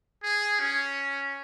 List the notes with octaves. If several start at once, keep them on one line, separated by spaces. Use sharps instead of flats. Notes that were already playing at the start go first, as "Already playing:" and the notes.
G#4
C#4